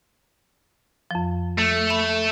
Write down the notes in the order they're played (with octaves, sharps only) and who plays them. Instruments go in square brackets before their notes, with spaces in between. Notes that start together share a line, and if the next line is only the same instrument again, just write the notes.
[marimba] F2 F3
[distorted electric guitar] A3
[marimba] B5